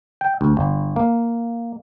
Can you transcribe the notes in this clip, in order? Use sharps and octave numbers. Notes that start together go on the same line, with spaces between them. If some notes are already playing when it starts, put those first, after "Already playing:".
G5
D2
G1
A#3